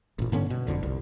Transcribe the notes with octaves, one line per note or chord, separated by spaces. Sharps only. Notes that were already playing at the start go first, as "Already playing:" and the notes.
A1 A#2
G2 D3 B3 C#4
B2
F#1 B1 F2 D3
C2